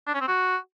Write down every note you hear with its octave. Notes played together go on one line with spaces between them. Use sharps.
D4
C#4
C4
F#4